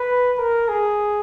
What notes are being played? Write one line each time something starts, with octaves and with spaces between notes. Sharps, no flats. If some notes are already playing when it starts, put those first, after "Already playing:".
Already playing: B4
A#4
G#4